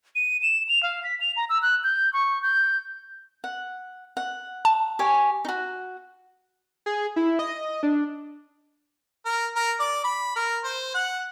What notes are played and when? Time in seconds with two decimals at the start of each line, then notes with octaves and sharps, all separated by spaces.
0.15 D#7
0.42 E7
0.69 F7
0.83 F5
1.04 B6
1.21 F7
1.37 A#5
1.50 E6
1.62 F#6
1.84 G6
2.13 C#6
2.43 G6
3.44 F#5
4.17 F#5
4.65 A5
4.99 G4 C#5 G#5
5.45 D#4 F#4
6.86 G#4
7.16 E4
7.39 D#5
7.83 D4
9.26 A#4
9.56 A#4
9.79 D5
10.04 B5
10.36 A#4
10.64 C5
10.94 F#5